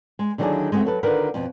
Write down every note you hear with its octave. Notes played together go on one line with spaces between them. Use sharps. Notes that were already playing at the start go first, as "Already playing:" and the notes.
G#3
D3 D#3 F#3 D4 E4 G#4
G#3 A3 C4 F#4
F#3 A4 B4
D3 D#3 F4 A#4 B4 F#5
F2 B2